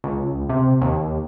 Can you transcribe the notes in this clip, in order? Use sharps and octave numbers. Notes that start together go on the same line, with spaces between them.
C#2
C3
D#2